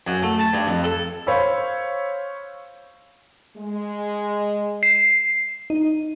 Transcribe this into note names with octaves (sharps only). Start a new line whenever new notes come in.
F#2
A3
A5
G2
F2
A4
C5 C#5 F5 B5 E6
G#3
C7
D#4